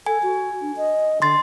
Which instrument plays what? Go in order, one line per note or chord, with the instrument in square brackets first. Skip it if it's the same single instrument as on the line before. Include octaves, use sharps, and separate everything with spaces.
[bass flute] A4 [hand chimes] G#5
[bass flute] F#4
D4
D#5
[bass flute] D3 [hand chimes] C6 A6